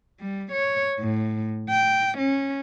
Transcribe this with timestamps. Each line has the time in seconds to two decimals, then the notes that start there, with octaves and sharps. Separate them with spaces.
0.20 G3
0.52 C#5
1.00 A2
1.69 G5
2.18 C#4